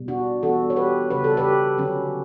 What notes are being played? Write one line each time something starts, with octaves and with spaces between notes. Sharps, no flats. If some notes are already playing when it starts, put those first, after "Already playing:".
Already playing: B2 G3
D4 F#4
E3 G3 B3 D4 F#4 A4
C#5
G4 B4
C#3 G3 D4 B4
A4
G4 B4
D3 F#3 C#4